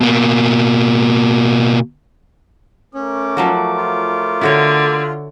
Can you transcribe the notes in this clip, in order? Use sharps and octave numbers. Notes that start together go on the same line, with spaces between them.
B2 A#3
A3 C#4 A#4 D6
F3 F#3 F#4
F4
D3 E4 F#4 C#5